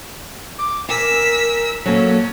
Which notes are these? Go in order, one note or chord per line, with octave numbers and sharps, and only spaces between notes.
D6
A#4 G#5 E6 B6
F#3 A#3 C#4 A4